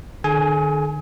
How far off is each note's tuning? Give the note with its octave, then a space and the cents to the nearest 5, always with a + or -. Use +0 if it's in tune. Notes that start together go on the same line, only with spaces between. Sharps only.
D#3 -45 G#4 +40 G#5 +0